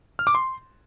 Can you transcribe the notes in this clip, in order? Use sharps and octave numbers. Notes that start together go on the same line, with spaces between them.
F6
D6
C6